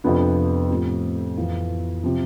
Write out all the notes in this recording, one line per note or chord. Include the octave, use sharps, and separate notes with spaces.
F2 C3 F3 B3 D4
A2 F3 C4 G4
F2 E3 B3 F4
C3 F3